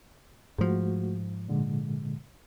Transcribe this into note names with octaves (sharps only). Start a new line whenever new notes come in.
G#2 F3 A3 F#4
A#2 D3 G#3